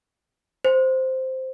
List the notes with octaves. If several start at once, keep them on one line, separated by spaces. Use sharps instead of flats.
C5